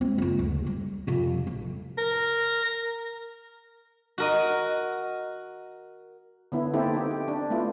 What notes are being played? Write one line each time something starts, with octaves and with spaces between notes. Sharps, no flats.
G#3 C4
F#1 F4
D2
G3
F2 C3
A1
A#4
F#4 A#4 D#5
D3 B3 E4
A#3 C4 D#4 E4 G4 A4
D#4 G4
G4
D4
A3 B3 E4 F4